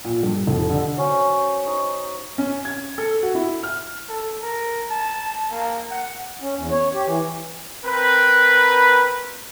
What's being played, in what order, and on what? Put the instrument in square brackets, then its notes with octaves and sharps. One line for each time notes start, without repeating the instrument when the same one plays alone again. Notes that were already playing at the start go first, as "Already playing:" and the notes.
[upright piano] A#2
G2
F1
D3
[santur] F#3 C#4 C5
D#4 C5
[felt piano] C#4
G#6
A4
F#4
E4
F6
[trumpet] A4
A#4
A5
A#3
F#5
[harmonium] C#4
E2
C#5
G4
E3
[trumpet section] C4 A#4 B4